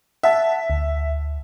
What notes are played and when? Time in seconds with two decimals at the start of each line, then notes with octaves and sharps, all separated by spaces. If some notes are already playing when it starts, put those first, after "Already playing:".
0.23 E5 F#5 A5
0.70 D2